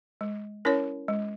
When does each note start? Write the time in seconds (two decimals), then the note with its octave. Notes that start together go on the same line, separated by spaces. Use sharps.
0.21 G#3
0.65 C#4 E4 A#4 C#5
1.08 G#3